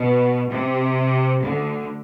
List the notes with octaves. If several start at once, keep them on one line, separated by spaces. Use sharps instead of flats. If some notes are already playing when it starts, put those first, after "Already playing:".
Already playing: B2
C3
D2 D3